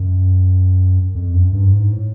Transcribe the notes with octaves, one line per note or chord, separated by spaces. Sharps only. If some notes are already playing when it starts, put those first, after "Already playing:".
Already playing: F#2
F2
F#2
G2
G#2
A2